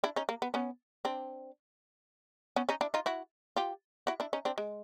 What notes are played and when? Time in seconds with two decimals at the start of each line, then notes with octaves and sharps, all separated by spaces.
0.04 D4 E4
0.16 C#4 D#4
0.29 A#3
0.42 B3
0.54 B3 C#4
1.05 C4 D4
2.56 B3 C#4
2.69 C#4 D#4
2.81 D4 E4
2.94 D#4 F4
3.06 E4 F#4
3.56 F4 G4
4.07 E4 F#4
4.20 D4 E4
4.33 C#4 D#4
4.45 C4 D4
4.58 G#3